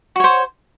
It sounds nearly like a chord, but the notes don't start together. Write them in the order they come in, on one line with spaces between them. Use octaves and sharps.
F#4 C#5 C5